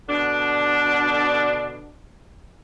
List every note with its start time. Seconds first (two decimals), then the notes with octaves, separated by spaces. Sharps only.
0.08 B2 D3 D4